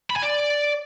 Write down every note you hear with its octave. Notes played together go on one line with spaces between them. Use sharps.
B5
G#5
D5